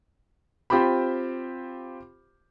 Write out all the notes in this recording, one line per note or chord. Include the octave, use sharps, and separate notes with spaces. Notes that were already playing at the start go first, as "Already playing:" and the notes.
C4 F4 G4 C5 B5